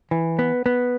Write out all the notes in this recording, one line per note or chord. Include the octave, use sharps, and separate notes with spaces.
E3
B3
B3